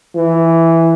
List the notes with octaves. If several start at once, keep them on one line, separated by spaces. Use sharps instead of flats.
E3